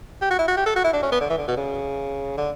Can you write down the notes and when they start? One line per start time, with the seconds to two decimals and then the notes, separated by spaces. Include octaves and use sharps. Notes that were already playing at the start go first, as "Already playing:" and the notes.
0.22 G4
0.31 F#4
0.39 E4
0.48 F#4
0.57 G4
0.66 A4
0.76 F#4
0.84 E4
0.93 D4
1.03 C#4
1.12 B3
1.21 D3
1.30 E3
1.38 D3
1.48 B2
1.57 C#3
2.38 D3